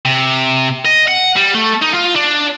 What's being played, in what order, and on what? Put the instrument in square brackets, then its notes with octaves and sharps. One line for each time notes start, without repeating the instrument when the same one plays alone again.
[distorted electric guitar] C3
D#5
F#5
G3
A3
D#4
F4
D4